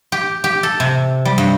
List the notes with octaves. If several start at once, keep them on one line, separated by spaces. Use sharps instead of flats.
G4
G4
A4
C3
G3
G2